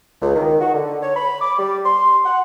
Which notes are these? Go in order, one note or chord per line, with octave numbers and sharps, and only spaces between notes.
C#2
D#3
F#4
D3
C#5
B5
D6
G3
C6
F#5